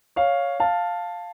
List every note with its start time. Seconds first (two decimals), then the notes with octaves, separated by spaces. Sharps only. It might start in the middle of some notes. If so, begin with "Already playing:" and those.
0.16 C#5 F5
0.60 F5 A5